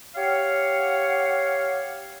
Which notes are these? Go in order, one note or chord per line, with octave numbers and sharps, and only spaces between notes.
G4 C#5 F5 F#5